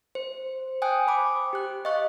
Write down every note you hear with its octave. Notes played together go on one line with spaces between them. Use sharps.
C5
G5 G#5 D#6 F#6
C5 B5 D6
G4 F#6
D#5 F5 C#6 F#6